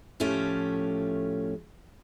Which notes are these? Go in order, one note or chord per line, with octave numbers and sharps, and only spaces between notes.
A2 F3 A3 C#4 G4